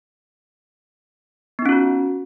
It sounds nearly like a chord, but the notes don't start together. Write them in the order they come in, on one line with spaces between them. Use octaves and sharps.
B3 D#4 C#4 F4 F#4